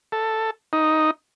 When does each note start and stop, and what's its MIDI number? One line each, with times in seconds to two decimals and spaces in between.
0.12 0.51 69
0.73 1.11 63